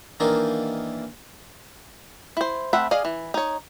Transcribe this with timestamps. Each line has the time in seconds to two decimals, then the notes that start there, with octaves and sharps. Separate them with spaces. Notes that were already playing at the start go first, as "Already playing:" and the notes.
0.20 D#3 E3 A#3 D4 D#4 F4
2.37 E4 C5
2.73 A3 C4 E5 F#5 B5
2.91 G#4 D5 D#5 F5
3.05 E3
3.34 D#4 C#5